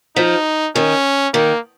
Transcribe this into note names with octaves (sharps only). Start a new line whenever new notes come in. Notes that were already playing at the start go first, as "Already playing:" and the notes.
F3 D#4
D#3 C#4
D#3 A#3